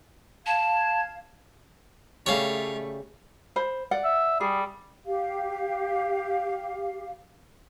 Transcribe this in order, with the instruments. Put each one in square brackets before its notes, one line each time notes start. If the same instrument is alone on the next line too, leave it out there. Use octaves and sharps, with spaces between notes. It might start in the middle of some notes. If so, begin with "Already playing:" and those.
[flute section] F5 G#6 [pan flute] A5
[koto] C#3 G3 [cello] A3 [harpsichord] C#5 F5
[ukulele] C5 B5
D5 F#5
[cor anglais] E5
[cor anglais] G3 [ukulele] G#4
[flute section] G4 F5